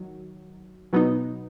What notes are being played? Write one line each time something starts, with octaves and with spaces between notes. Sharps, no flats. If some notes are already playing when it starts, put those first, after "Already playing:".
Already playing: D#3 F#3
B2 F#3 B3 D#4